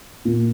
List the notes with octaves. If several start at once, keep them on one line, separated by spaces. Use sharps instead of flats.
A#2